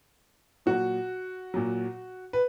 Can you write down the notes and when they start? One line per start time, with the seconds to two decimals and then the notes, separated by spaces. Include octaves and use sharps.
0.66 A#2 F#3 F#4
1.54 A#2 F#3
2.33 B4